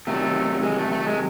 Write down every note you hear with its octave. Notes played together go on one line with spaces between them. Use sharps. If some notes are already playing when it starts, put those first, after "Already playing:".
C3 D#3 F#3 A3
G#3
A3
A3
G#3